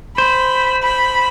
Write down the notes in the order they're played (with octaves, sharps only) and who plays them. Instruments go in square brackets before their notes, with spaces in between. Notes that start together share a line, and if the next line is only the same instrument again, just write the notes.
[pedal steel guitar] C5 [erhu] B5
[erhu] B5